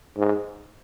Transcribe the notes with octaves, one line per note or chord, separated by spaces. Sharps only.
G#2